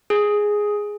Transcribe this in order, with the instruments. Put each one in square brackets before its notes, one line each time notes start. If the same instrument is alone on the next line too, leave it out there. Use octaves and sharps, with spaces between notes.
[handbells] G#4